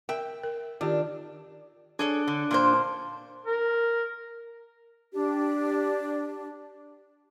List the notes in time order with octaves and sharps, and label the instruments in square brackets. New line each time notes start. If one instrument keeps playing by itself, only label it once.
[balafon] A#4 [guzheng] E5 [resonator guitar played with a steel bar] G5
[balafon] A#4
[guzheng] D#3 [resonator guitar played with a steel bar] D4 [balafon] F4 G4
[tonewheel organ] D4 [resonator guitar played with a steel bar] G#4 A4 C#5
[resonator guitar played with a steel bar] D3
A#2 A#3 C5
[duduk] A#4
[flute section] D4 G4